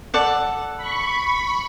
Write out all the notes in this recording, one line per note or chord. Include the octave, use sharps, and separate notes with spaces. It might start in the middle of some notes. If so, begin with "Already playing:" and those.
A4 D5 F#5
B5 C#6